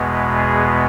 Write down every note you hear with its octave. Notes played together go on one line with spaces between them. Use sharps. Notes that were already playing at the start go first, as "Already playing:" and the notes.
Already playing: E2 B2 G#3 B3
G#4